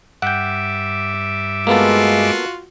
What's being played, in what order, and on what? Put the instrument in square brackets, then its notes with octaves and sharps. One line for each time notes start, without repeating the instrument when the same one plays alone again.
[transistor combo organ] G2 E5 D6 [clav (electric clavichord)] F#5 G5
[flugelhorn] G#3 [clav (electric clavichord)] A#3 B3 A4 [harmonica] F4 F#4